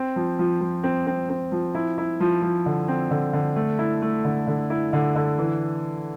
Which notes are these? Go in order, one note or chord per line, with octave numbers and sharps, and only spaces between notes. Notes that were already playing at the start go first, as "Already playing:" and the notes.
Already playing: C4
F3
F3
F3
C4
C4
C4
F3
E4
E4
F3
F3
D3
C4
D3
D3
A3
E4
A3
D3
D3
E4
D3
D3
E3